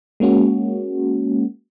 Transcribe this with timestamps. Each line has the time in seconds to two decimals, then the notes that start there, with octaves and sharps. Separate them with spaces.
0.20 G#3 A#3 C#4 F#4